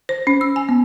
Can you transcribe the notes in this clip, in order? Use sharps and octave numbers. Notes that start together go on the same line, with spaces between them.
C5
C#4
E6
G#5
B3